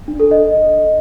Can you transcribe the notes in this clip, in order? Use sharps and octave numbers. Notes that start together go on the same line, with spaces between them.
D4
A4
D#5